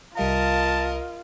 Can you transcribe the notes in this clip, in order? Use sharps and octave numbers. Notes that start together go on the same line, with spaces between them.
C2 G3 F4 A#4 D#5 F5 A5